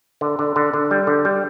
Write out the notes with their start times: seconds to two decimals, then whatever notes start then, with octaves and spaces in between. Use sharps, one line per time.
0.21 D3
0.39 D3
0.56 D3
0.74 D3
0.91 G3
1.07 D3
1.25 G3